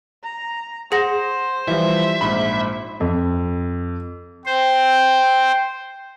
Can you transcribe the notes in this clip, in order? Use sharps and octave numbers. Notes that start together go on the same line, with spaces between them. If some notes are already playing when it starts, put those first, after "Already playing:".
A#5
G#4 C5 F#5 A#6
E3 F3 G3 E5
A#1 G#2 B5
F2
C5 G5